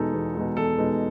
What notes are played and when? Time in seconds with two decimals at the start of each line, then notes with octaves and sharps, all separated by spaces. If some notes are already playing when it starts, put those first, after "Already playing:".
Already playing: E2 B2 G#3 D#4 A4
0.14 E2
0.35 B2 G#3 D#4
0.57 E2 A4
0.78 B2 G#3 D#4